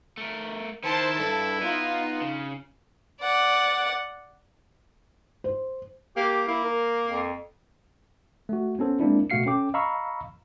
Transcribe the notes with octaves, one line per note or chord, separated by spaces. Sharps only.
A3 A#4
D#3 E4 C5 A5
G2 A4
B3 D#4 F4
C#3
D5 F#5
C5
A#3 G4
A#3 E4
A#4
F2
A3 F#4
B3 C#4 A4 C5
G#3 A#3 C4 D4 E4
B2 A3 F#4 F5 C7 C#7
C#4 A4 G5 D6
D#5 F5 A#5 B5 C#6 E6